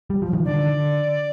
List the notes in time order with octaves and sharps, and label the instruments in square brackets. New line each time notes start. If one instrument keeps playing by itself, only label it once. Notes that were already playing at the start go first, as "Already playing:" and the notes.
[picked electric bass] G3
F3
D#3
[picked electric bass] D3 [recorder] D5